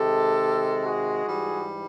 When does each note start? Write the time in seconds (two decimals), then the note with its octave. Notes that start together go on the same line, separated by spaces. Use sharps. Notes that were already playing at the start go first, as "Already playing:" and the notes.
Already playing: C3 D#3 G#3 G4 A4
0.85 F#4 G#4
1.25 G#2 E3 G3